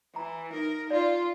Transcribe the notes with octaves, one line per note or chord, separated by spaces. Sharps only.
E3 A#5
D#4 A#4
F4 D5